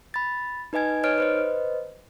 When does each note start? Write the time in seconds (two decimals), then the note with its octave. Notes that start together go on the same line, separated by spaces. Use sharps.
0.14 B5 A6
0.73 D#4 B4 D#5 G#5 G#6
1.03 D#4 B4 C#5 D#5 F6 D7
1.18 B4 C5 D#5